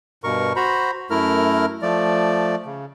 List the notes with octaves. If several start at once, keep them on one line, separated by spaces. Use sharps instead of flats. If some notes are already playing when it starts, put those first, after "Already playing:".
G2 B2 A#4 C#6
F#4 C5 A#5 B5
F#2 A3 E4 A#4 F6
F3 A3 D5
C#3